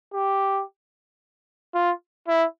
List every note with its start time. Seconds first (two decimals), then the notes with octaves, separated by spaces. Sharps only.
0.14 G4
1.75 F4
2.28 E4